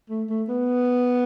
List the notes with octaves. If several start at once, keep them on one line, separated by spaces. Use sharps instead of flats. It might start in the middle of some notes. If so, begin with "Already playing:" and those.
A3
A3
B3